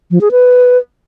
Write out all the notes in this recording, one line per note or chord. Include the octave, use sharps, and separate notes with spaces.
F3
G#4
B4